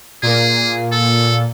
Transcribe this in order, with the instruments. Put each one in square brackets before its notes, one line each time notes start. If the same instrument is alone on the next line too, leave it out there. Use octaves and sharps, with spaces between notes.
[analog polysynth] A#2 A#3 [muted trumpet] G#4
[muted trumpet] A4